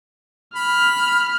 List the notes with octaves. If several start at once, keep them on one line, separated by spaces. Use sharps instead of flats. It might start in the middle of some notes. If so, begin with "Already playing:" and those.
B5 F6